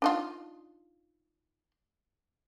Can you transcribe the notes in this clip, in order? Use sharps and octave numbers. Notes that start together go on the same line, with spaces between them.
D4 D#4 F4